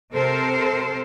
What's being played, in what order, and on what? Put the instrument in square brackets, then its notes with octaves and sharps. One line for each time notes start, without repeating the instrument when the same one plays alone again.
[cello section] C3 A4 A#4 C5